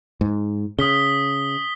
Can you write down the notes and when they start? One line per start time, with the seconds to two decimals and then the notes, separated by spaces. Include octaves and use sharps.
0.21 G#2
0.79 C#3 D#6 B6 G7